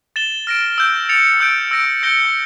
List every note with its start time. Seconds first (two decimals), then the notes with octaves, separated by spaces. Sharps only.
0.16 A6 E7 G7
0.47 F6 A#6 D7
0.78 E6 G6 D7
1.09 A6 C#7 F7
1.40 E6 G6 D7
1.71 E6 A#6 D7
2.03 G6 A#6 C#7 G7